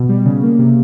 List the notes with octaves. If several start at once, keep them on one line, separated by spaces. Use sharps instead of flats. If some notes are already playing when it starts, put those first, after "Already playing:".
Already playing: B2
G3
C#3
A#3
C3